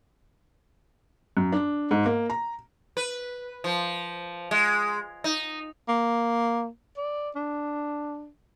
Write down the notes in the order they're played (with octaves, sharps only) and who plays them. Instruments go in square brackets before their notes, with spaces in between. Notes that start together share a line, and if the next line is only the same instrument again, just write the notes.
[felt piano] F#2
D4
G#2
A#3
A#5
[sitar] B4
F3
G#3
D#4
[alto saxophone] A#3
D5
D4